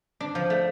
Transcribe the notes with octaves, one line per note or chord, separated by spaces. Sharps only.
D4
F3
A3